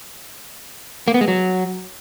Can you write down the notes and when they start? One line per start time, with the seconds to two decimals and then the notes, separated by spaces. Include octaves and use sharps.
1.08 A#3
1.14 B3
1.21 G#3
1.28 F#3